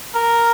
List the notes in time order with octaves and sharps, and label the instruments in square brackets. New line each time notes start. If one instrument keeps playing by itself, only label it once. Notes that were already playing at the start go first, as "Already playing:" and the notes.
[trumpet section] A#4